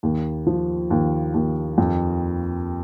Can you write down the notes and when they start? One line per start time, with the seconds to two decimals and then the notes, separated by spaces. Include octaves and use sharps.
0.03 D#2
0.47 F3
0.90 D#2
1.34 D#2
1.78 F2